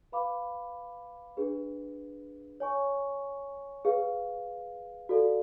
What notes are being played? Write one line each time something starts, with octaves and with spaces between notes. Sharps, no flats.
B4 F5 B5 D6
D4 G#4 B4
C#5 G#5 C#6
G#4 B4 F5
F#4 A4 D5 F5